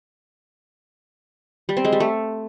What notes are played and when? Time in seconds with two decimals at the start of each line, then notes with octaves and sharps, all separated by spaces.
1.69 G3
1.77 C4
1.85 G#3
1.92 G3
2.00 A3